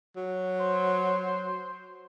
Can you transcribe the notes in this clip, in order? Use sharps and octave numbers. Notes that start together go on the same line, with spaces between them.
F#3
C5